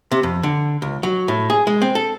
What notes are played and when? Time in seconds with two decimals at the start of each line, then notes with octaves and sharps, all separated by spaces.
0.11 C3
0.23 F2
0.43 D3
0.82 C#2
1.03 F#3
1.28 A2
1.50 G#4
1.67 G#3
1.82 C4
1.95 A4